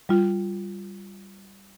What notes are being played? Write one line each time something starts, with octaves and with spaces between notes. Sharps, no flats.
G3 F4